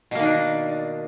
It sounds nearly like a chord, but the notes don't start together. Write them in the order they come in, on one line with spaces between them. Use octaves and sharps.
B2 A#3 D#3 D4